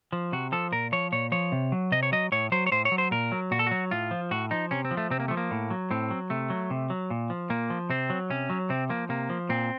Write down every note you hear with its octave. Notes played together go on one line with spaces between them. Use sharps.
F3
C3 F#4
F3 A4
A#2 A#4
F3 C#5
A#2 C#5
F3 C#5
C3
F#3
C3 D#5
C#5
F#3 D#5
A2 C#5
F#3 C5
C#5
A2 C5
C#5
F#3
C5
A#2 A#4
F#3
A#2 F#4
A4
F#3 F#4
A2 F4
F3
A2 F#4
F3 D#4
C3 C#4
C4
F3
A3
C3 C4
A#3
F3 A3
A#3
A2
F#3
A2 C4
F#3
C3 A3
F#3
C3
F#3
A#2
F3
A#2 A#3
F3
C3 C4
F#3
C3 C#4
F#3
C3 C4
F3 A#3
C3 A#3
F3
A#2 C4